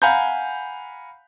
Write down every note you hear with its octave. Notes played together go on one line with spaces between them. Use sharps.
F5 F#5 G#5 A#5 B5 G6